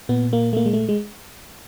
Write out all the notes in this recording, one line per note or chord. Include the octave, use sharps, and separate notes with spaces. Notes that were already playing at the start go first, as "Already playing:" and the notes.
A#2 B3
A#3
A3
A#3
G#3
A3
G#3